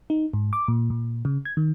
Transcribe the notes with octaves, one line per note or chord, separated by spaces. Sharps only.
D#4
G#2
D6
A#2
A#2
C#3
G#6
D#3